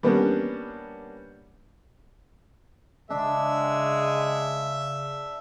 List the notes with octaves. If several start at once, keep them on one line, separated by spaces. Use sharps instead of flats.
G3 A#3 B3 C#4 D4
C#3 G#3 D4 E5